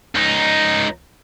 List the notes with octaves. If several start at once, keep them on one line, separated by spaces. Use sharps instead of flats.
C#2 D#4